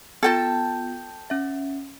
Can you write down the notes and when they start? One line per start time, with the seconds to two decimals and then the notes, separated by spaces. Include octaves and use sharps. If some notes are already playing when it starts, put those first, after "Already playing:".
0.23 B3 F4 A4 G5 A5
1.30 C#4 E5